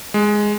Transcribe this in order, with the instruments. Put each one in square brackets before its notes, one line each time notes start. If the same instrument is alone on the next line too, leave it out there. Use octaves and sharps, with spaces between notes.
[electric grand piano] G#3